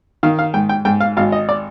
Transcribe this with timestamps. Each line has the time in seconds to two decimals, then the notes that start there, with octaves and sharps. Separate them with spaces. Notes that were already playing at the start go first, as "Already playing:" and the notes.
0.23 D#3 F5
0.39 F5
0.54 G#2 G5
0.69 G5
0.85 G#2 G5
1.00 F5
1.17 G#1 F5
1.32 D#5
1.49 D5